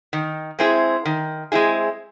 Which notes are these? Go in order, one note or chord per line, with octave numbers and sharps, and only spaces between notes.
D#3
G#3 C4 E4 G#4
D#3
G#3 C4 E4 G#4